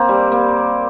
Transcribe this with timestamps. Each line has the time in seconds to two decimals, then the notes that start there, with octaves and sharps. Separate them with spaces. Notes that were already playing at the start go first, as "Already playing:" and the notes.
Already playing: A#3 C4
0.09 G3
0.32 A#3